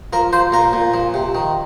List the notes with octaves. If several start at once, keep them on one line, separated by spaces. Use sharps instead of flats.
F3 A#4
F3 C5
A#2 A#4
A#2
F3
C3
D#3